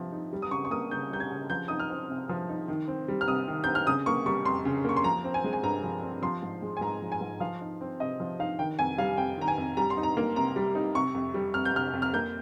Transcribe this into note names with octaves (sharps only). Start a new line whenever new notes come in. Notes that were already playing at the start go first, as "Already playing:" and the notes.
Already playing: C3 F3
D#4
G3
D#6
C#3 C#6
C#6
A#3 D#6
C#3 G6
G3 G6
G#6
C#3
F3 G6
D#4 D#6
F6
C4
C3
F3
D#4
D#3
C4
G3
F6
C3 D#6
D#3
C4 G6
F6
C#3 D#6
A#3 C#6
G3 C#6
F2 C6
C#3
A#3 C#6
C6
F3 A#5
C4
G#5
G#3
G#5
G2 A#5
F3
C4
F3 C6
G#2
G#3
G#5
G#2 A#5
F3
G#5
G#2
F3 F5
D#4
C4
C3 D#5
F3
D#4 F5
D#3 G5
F2 G#5
G3 F5
F2 G5
D#3 A#5
G#5
F2
G3 A#5
C6
D#4
A#5
A#3
C3 A#5
G3
D#4
C3 C#6
F2
G3
F2 F6
G6
C3 F6
F2
F6
A#3 G6